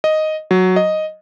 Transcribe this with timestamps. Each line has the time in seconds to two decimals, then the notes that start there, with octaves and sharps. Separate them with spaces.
0.04 D#5
0.51 F#3
0.76 D#5